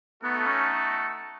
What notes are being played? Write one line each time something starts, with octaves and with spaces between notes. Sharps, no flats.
A3 B3 D#4 F#4 A4
C#4